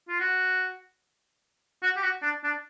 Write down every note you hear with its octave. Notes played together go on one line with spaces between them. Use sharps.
F4
F#4
F#4
G4
F#4
D4
D4